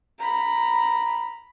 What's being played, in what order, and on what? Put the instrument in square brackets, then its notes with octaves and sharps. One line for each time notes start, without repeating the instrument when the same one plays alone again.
[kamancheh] A#5 B5